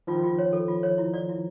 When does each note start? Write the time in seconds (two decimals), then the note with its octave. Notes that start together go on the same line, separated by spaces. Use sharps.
0.07 D#3 F3 F4
0.24 F4
0.39 C#5
0.53 A4
0.68 F4
0.83 C#5
0.98 E4
1.14 D5
1.29 E4